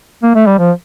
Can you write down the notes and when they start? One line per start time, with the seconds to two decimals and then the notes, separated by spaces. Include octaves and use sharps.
0.23 A#3
0.35 A3
0.47 G3
0.59 F3